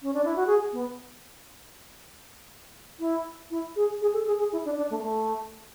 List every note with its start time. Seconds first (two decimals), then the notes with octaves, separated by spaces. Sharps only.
0.02 C#4
0.14 D4
0.25 E4
0.36 F#4
0.47 G#4
0.73 B3
3.00 E4
3.51 E4
3.76 G#4
4.02 G#4
4.14 A4
4.27 G#4
4.39 G#4
4.52 E4
4.65 D4
4.77 D4
4.90 A3
4.99 B3
5.03 A3